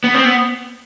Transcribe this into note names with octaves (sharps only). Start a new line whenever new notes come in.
B3
C4
B3